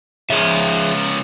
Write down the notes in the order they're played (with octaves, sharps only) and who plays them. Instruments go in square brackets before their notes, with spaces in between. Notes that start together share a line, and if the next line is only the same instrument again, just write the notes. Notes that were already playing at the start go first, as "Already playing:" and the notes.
[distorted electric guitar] C#2 F3 [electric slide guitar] G#4 E5